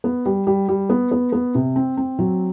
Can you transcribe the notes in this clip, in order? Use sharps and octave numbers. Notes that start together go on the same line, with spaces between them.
B3
G3
G3
G3
B3
B3
B3
C3
C4
C4
F#3